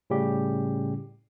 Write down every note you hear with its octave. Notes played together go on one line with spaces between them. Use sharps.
A2 C#3 G3 C#4 G4